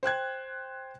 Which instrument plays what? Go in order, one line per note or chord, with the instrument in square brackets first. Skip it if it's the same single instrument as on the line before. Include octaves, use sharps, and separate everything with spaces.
[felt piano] C5 G5 F#6 G#6